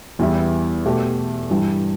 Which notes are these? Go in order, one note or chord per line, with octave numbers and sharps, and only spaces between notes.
E2 E3 G3 E4
B2 A3 G4
G2 E3 G3